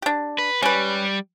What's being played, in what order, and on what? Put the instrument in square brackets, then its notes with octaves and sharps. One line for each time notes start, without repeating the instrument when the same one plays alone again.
[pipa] D4 G4
[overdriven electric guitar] B4
[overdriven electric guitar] G3 [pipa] C#4 B4